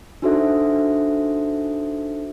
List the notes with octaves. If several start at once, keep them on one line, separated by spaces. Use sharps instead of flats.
D4 D#4 F#4 A4 C5 E5